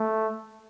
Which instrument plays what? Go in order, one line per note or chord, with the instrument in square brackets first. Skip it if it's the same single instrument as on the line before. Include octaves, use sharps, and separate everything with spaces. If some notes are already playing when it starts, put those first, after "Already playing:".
Already playing: [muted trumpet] A3